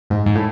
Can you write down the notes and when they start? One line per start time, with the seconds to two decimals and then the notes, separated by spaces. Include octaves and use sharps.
0.10 G#2
0.26 G#2
0.35 A2